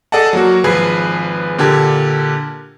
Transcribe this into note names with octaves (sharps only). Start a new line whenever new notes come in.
G#4 A4 D5 D#5 F#5 A5
F#3 A#3 F#4
G#1 F3 G#4 B4 G#6 C7
A#2 D3 G4 A#4 A5 G#6